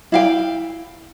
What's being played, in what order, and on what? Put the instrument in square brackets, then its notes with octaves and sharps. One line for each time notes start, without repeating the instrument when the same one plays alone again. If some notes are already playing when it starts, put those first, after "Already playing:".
[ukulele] E4 F5 G5